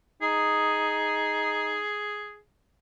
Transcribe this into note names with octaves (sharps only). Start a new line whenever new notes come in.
D#4 G#4